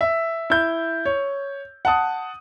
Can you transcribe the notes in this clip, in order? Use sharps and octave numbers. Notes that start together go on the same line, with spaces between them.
E5
E4 G6
C#5
F#5 A5 D#6